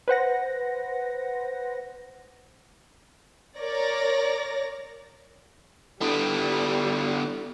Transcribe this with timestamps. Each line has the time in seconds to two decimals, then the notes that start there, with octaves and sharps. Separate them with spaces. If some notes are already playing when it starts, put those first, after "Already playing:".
0.08 B4 C5 F#5 A#6
3.58 A#4 C#5 D5 A#6
6.01 D3 G3 B3 D4 E4 A4